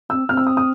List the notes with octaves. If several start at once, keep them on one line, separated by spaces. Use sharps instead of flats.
C4 E6
C4 F6
E6
D#6
D#6